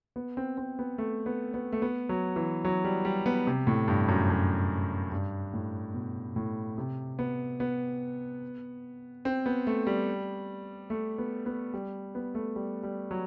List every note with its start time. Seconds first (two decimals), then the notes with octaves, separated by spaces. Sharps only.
0.16 B3
0.37 C4
0.58 C4
0.79 B3
0.98 A3
1.26 B3
1.54 B3
1.72 A3
1.82 B3
2.09 F#3
2.36 E3
2.65 F#3
2.84 G3
3.05 G3
3.26 B3
3.47 C3
3.67 A2
3.88 G2
4.08 F#2
4.30 F#2
5.12 G2
5.53 A2
5.94 B2
6.36 A2
6.78 C3
7.19 B3
7.60 B3
9.25 C4
9.46 B3
9.67 A3
9.87 G3
10.90 A3
11.18 B3
11.46 B3
11.74 G3
12.15 B3
12.35 A3
12.56 G3
12.83 G3
13.11 F#3